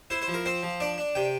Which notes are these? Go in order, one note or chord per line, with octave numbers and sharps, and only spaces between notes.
E4 C5
C5
F3
A#4
C4 C5
F3
D4 D5
D4
C3 G5